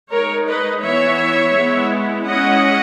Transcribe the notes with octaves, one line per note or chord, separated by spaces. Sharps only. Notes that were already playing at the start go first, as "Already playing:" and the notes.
G#3 D#4 A#4 C#5
B4 D#5
E3 B3 E4 C#5 E5
G#3 B3 E4
G#3 C#4 E4 D#5 F#5